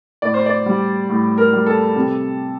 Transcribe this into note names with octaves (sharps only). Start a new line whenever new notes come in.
A2 D5
C5
D5
G3
A2
A#4
G3
A4
C3